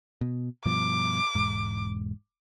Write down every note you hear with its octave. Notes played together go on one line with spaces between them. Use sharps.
B2
G2 B2 F3 D6
E1 G#2